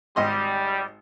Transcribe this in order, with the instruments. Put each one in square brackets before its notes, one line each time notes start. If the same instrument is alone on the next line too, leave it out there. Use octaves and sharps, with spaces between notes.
[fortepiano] G#1 D#5 C6 [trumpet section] G3